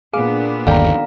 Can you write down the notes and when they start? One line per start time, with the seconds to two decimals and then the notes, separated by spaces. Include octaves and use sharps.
0.13 A#2 B3 D4 G#4 F5 D6
0.67 G1 D#2 A4 D5 F5 G5 A#5